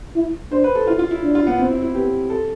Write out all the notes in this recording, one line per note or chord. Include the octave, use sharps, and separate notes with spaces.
E4
D4 C5
B4
A4
E4 F4
F4
E4
D4
F4
B3
C4
E4
E4
B3 G4
A4